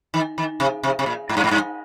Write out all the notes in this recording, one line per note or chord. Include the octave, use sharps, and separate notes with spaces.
D#3
D#3
C3
C3
C3
A#2
G#2
G2
G#2
G2